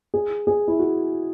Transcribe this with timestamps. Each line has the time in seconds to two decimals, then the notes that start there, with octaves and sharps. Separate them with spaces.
0.14 G#4
0.47 G#4
0.68 E4
0.79 F#4